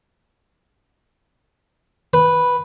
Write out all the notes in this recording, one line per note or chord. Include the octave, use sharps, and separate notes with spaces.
B4